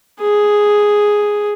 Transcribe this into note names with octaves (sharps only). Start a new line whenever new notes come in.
G#4